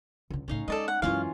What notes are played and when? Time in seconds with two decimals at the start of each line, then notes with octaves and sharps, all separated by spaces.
0.30 C#2 D3
0.48 A2 C#3 C#4 D#4 F5
0.68 G#3 A4 D5 D#5
0.88 F#5
1.02 F#2 E3 G#3 C#4 F4 F5